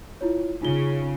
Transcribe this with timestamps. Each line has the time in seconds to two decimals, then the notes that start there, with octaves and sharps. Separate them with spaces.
0.21 E4 F4 C#5
0.62 C#3 D#4 F4 G7